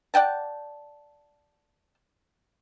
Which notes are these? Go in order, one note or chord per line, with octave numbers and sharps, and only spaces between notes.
D5 F#5 G5 A5